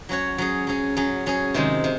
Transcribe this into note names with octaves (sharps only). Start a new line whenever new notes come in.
F#3 C#4 F#4 C#5
F#3 C#4 G#4
F#3 C#4 G#4
F#3 C#4 G#4
F#3 C#4 G#4
C3 D#3 G#3
C3